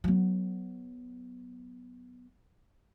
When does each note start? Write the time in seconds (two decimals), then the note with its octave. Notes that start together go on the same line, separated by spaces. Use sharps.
0.04 F#3 B3